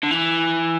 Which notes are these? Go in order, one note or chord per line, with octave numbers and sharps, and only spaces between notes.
D3
E3